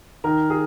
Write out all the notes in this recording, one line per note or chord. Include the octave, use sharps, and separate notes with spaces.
D#3 A#4
G#4